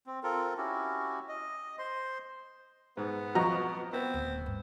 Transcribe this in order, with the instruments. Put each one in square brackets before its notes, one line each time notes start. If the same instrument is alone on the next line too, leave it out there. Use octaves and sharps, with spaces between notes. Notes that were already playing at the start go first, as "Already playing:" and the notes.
[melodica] C4
C4 F4 A4 A#4
C#4 E4 F#4 G4
D#5
C5 C6
[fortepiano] G#2 [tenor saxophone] B3
[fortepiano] F2 D#5 A#5 [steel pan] F#4
[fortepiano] B3 [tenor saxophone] C4
[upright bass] D1
G1